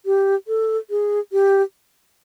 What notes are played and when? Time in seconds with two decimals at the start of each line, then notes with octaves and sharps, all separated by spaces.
0.06 G4
0.48 A4
0.90 G#4
1.32 G4